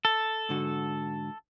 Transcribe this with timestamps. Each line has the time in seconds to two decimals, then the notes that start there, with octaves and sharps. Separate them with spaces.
0.05 A4
0.49 G#2 D3 F#4